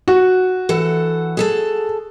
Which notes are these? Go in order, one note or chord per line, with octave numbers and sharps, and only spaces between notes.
F#4
E3 A4 F#5
G#4 A4 A5